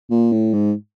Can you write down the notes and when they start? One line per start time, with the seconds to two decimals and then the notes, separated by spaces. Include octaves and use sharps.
0.10 A#2
0.32 A2
0.54 G#2